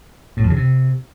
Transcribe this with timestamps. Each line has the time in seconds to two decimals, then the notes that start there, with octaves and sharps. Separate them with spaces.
0.37 A2
0.43 F2
0.50 C#3
0.56 C3